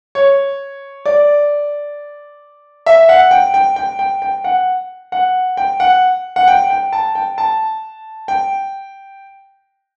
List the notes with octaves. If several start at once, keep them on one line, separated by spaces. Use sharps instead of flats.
C#5
D5
E5
F#5
G5
G5
G5
G5
G5
F#5
F#5
G5
F#5
F#5
G5
G5
A5
G5
A5
G5